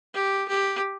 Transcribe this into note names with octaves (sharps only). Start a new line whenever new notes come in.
G4
G4